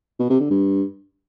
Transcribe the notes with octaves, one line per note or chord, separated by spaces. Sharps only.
B2
C3
D3
G2